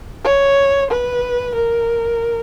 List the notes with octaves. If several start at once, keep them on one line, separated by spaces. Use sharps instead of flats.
C#5
B4
A#4